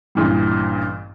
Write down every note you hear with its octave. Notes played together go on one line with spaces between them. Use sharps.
A1 G2 A#2 E3 G3